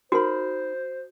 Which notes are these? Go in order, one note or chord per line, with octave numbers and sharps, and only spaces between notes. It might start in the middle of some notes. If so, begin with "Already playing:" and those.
D#4 F#4 A#4 C5 B5